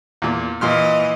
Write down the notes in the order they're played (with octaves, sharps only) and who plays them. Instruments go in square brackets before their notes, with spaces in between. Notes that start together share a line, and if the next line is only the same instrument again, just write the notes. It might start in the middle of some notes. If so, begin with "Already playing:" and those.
[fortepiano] E2 A#2
[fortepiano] A#2 C6 F6 [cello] E3 D#5